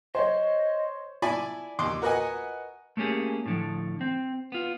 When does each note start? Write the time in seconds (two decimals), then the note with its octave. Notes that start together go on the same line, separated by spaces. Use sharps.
0.15 C5 C#5 D#5
1.22 E4 D5 G#5 A5 B5
1.79 D#2 C6 D6
2.02 F#4 A#4 B4 D#5 F#5 G#5
2.97 A3 A#3 C#4 G4 G#4
3.46 A2 D3 F3
4.01 C4
4.52 B3 F4